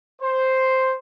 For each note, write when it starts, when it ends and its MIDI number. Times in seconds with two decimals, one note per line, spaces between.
0.21 0.94 72